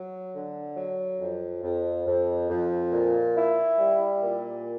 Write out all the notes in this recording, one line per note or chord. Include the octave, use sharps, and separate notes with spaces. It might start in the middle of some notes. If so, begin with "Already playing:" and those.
Already playing: F#3
D3
F#3
F2
F2
F2
F2
A#2
E4
G3
A#2